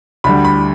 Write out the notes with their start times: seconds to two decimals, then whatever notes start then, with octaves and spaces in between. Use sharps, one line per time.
0.24 D2 D3 G3 B5
0.45 B5